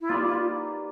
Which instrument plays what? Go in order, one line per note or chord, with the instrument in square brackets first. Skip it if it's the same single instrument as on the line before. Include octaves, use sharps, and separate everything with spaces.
[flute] E4
[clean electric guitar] A#3 D#4 G4 B4 D5 [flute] F4
[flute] F4